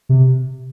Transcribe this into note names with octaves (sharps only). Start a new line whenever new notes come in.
C3